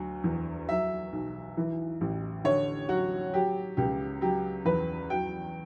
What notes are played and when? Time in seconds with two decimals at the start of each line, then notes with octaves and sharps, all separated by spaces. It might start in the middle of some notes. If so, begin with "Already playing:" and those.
Already playing: D2 F#3
0.24 E2
0.69 F#3 E5
1.13 B1
1.57 E3
2.01 A1
2.44 D3 C#5
2.89 F#3 F#4
3.33 F#3 G4
3.77 C#2 G4
4.21 F#3 G4
4.65 E2 B4
5.10 F#3 G5